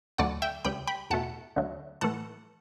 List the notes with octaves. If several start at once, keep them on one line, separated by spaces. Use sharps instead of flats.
D2 D3 F#3 A3 D5 F#5
E5 G5
C#2 C#3 G3 G5 B5
G5 B5
E2 B2 A3 F#5 A5
D2 D3 F#3 A3
A2 E3 A3 F#5 A5